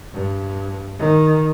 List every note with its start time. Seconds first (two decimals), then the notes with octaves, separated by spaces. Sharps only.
0.14 G2
0.99 D#3